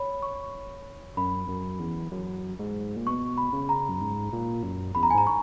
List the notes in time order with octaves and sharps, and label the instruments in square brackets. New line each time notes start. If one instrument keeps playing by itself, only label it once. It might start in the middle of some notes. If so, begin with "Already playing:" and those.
Already playing: [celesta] C#5 B5
C#6
[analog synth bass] F#2 [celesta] B5
[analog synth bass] F#2
E2
F#2
G#2
A#2
[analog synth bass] B2 [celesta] C#6
[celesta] B5
[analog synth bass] C#3
[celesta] A#5
[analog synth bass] F#2
G#2
A#2
F#2
[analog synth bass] E2 [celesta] B5
[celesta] A#5
G#5
[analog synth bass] G#2 [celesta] A#5
[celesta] C#6